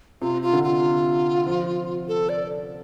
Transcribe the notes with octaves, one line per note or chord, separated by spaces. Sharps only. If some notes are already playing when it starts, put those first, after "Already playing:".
C3 F4
F4
D3
F4
F3
A4
D5